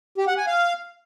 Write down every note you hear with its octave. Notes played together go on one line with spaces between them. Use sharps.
G4
F#5
G#5
F5